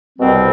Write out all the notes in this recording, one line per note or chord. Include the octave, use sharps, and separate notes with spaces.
C2 B2 G3 C4